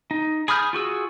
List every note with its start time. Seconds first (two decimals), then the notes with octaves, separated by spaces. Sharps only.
0.11 D#4
0.48 G#4 B5 D#6 F6 G6
0.73 F4 F#4 G#4 E6